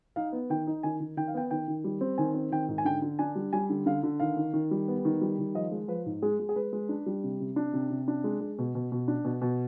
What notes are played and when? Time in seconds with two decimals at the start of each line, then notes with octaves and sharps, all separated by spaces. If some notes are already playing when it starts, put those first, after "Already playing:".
0.16 D#4 F5
0.32 B3
0.50 D#3 G5
0.67 D#4
0.83 D#3 G#5
1.00 D#3
1.17 D#3 G5
1.28 F5
1.34 B3 G5
1.51 D#3 G5
1.68 D#3
1.84 G3
2.01 C4
2.18 D#3 G#5
2.34 C4
2.51 D#3 G5
2.69 G#2
2.78 G#5
2.85 D3 G5
3.02 D3
3.19 D4 G#5
3.35 G3
3.53 G3 G#5
3.70 D3
3.86 D3 F5
4.03 D3
4.20 D#3 F5
4.37 D#3
4.53 D#3
4.71 G3
4.88 B3
5.05 D#3
5.21 G3
5.39 D#3
5.55 F3 D#5
5.71 G#3
5.88 F3 B4
6.06 G#2
6.22 G#3 G#4
6.39 G#3
6.49 G#4
6.56 G#3 B4
6.73 G#3
6.89 D4
7.06 G3
7.24 C3
7.40 C3
7.56 D4
7.73 C3
7.90 C3
8.08 D4
8.24 G#3
8.41 G#3
8.58 B2
8.75 B2
8.92 B2
9.08 D4
9.25 B2
9.42 B2